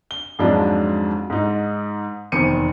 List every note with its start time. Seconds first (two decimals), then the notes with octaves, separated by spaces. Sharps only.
0.11 G7
0.39 F2 G#2 F3 F#3 G#3 D4
1.30 G#2 D#4
2.32 F1 E2 D#3 C5 C#7 D#7